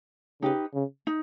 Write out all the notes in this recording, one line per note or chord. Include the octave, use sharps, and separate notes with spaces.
C#3 D#4 G4 B4
C#3
D#4